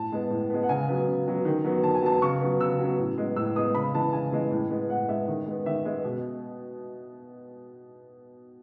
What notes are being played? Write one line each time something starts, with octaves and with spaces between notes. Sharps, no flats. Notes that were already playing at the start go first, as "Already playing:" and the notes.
Already playing: A2 A5
G#3 B3
A2
G#3 B3
F#5
C#3 G#5
F#3 B3
C#3
F#3 B3
D#3
F#3 B3
D#3 A5
G#5
F#3 B3 A5
C#3 C#6
F#3 B3
C#3 E6
F#3 B3
A2
G#3 B3
A2 E6
G#3 B3 D#6
C#3 B5
E3 G#3 A5
C#3 G#5
E3 G#3
A2
G#3 B3
A2 F#5
G#3 B3 E5
D#3
G#3 B3
D#3 E5
G#3 B3
B2